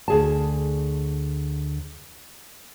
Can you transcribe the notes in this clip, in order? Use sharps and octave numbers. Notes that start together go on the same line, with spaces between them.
D2 G#4 A5